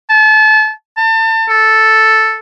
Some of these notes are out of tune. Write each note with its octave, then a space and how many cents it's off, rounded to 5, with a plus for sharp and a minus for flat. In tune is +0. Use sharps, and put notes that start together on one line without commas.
A5 -30
A5 +35
A4 +0